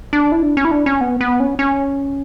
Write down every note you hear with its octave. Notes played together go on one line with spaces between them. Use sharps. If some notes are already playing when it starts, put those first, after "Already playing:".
D4
E4
D4
C#4
E4
D4
C#4
B3
B3
C#4
C#4